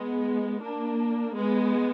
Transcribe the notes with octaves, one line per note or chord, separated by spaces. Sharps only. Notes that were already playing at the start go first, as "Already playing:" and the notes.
Already playing: G#3 B3
A#3 D4
G#3 B3